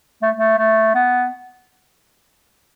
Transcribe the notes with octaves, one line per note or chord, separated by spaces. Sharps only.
A3
A3
A3
B3